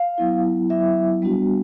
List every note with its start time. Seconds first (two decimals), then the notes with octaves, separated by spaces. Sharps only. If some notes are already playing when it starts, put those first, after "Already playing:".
Already playing: F5
0.18 F#3 B3 E4
0.70 F#3 B3 E4 E5
1.22 G3 B3 D4 F#4